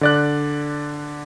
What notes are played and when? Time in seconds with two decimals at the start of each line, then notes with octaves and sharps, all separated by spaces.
0.01 D3 D5 F#6